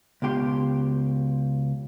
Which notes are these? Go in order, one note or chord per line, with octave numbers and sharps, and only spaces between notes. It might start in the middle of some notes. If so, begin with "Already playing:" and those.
C#2 B2 G4 C6